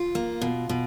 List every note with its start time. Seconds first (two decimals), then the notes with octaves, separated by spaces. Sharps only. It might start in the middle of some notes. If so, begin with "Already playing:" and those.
Already playing: F4
0.15 A#3
0.41 B2
0.69 B2